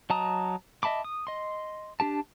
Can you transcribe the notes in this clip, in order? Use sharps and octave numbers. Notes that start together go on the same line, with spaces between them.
F#3 D#5 A5 A#5 D#6
D#5 E5 A5 B5 D6
D#6
D#5 C6
D4 G4 A5